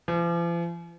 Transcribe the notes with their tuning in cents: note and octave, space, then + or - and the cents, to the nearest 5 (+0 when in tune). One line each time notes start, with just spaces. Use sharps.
F3 -45